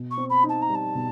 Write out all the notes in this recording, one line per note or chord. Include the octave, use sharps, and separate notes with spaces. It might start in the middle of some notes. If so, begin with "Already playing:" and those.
Already playing: B2
C#6
C4
B5
D#4
A5
A#5
G3
A5
B2